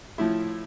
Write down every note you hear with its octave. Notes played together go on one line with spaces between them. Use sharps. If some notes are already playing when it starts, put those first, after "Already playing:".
A2 F3 E4